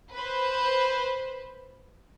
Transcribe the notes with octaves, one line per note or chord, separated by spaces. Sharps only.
B4 C5